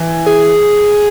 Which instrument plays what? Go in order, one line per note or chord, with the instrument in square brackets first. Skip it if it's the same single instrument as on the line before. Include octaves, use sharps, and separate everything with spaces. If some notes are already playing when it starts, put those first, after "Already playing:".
Already playing: [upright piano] E3
[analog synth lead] G#4